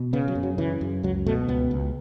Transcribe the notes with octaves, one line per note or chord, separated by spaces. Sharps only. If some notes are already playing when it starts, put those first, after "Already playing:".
Already playing: B2
C#3 B3
F#3
F#2
F#3
C#3 E3
F#2
C#2 F#3
B2 A3
C#2 B3
C#2